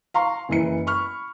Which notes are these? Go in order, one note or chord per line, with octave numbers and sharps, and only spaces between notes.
F5 A#5 C6 C#6
F#1 E3 C#7
B5 C#6 F6